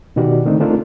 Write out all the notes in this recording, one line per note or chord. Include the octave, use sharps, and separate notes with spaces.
B2 D#3 D#4 F#4 G4 D5
D3 D#3 A3 C4 D4 D#4
A3 C4 D4 D#4 F4 A#4